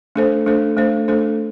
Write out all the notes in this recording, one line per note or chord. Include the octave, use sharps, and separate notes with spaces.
A3 D4 A4 C5
A3 D4 A4 C5
A3 D4 A4 C5
A3 D4 A4 C5